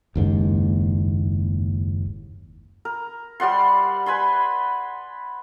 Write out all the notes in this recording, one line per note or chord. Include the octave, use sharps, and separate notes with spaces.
F#1 D#2 G#2
A#4
G3 D5 F#5 C6
B4 G#5 B5 C6